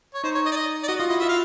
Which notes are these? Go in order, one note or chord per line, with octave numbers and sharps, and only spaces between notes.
C#5
D#4 C5
C#5
D#5
D5
D#5
D5
F#4 D#5
F4 D#5
E4 D#5
F4 E5
F5